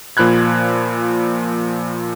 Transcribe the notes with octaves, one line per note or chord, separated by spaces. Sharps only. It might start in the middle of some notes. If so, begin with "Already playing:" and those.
A#2 F3 B5 F#6 G#6